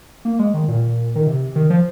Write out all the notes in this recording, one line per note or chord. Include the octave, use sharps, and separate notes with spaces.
A#3
G#3
D#3
A#2
D#3
C3
D#3
F3